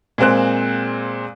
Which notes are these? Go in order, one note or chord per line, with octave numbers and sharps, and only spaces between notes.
A#2 G#3 C4 C5 F#6